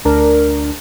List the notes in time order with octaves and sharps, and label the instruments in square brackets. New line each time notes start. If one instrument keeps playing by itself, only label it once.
[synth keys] D2 D4 A#4